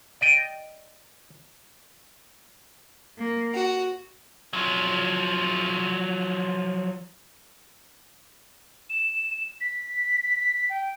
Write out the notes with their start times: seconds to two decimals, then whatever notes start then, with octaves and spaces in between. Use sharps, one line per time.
0.21 D5 D#5 G5
3.18 A#3
3.53 F#4
4.53 F3 F#3
8.90 E7
9.61 B6
10.70 G5